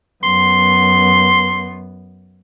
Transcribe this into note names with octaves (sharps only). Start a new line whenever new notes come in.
F#2 B3 C6